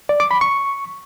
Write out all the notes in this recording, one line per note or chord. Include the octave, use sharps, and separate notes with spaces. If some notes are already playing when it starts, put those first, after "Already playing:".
D5
D6
B5
C#6